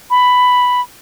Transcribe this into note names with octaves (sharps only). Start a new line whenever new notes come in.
B5